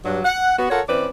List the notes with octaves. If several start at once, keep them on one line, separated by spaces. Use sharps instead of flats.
G2 F#3
F#5
B3 F#4
F4 A4 A#4 C#5 F#5
E3 C4 C#4 B4 D5